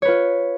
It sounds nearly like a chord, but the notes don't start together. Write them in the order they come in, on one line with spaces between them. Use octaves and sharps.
C#5 B4 F4